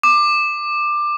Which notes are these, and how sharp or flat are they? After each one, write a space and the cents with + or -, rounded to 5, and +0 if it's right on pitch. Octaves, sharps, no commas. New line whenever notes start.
D6 +15